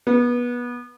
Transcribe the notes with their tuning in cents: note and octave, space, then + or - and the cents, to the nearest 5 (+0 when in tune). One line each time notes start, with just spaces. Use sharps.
B3 -25